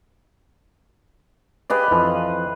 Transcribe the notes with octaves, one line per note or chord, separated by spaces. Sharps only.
G4 G#4 B4 D5 D#5 F5
F2 E3 F3